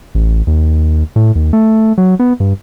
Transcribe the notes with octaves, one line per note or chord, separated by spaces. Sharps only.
A1
D#2
A2
D#2
A3
F#3
B3
G2